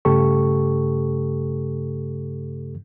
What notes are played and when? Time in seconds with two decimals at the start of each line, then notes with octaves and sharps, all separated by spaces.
0.05 G2 C#3 A3 G4 A4 C#6